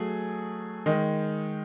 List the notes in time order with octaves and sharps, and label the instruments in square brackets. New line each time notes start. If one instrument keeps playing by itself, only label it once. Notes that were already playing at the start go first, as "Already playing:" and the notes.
Already playing: [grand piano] F#3 A3 G#4
D#3 G#3 D#4